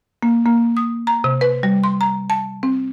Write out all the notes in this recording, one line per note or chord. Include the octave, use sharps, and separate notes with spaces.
A#3
A#3
D#6
A#5
C3
B4
G3
C6
A#5
A5
C4